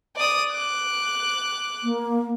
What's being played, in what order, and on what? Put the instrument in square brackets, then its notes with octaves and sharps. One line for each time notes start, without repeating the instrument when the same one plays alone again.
[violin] D5 D#6
D6 F#6
[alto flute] A#3